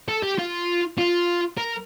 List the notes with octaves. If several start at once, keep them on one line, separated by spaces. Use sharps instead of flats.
A4
G4
F4
F4
A#4